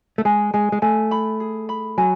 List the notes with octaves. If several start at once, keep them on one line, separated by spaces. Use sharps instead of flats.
A3
G#3 G#5
G#3 G#5
G#3
A3 G#5
B5
G#4
B5
F#3 G#5